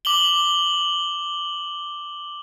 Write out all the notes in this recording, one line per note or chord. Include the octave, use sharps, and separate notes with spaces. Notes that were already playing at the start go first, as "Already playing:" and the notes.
D6 F#7 G7